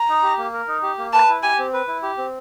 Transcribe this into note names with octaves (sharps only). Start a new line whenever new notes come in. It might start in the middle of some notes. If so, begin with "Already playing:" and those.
Already playing: A#5
D#4
G4
A#3
A#4
D#4
G4
A#3
B4 A5
E4
G4 G#5
C4
B4
E4
G4
C4